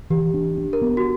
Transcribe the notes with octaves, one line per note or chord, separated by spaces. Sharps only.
E3 G4
D4
D4
A#4
B3
F#4